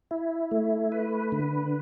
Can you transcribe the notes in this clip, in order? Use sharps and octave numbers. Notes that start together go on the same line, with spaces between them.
E4
A3
B4
D3